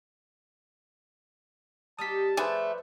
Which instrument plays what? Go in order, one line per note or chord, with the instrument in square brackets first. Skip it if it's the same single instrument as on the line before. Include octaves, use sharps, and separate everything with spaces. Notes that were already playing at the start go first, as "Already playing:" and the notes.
[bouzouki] G3 D#4 G4 [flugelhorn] A5 [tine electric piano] D#6 B6
[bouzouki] F3 F#5 [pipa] A3 G#4 G#5 [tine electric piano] B4 C5 D5